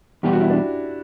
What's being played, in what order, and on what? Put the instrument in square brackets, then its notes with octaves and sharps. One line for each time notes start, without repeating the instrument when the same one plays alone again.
[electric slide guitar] E2 B2 G3 [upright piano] G4
[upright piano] F#4
E4
D4